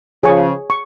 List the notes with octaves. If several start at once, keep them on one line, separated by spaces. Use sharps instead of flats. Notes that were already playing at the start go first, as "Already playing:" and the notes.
C#3 F3 G#4 C#5 G#5 C#6
C#6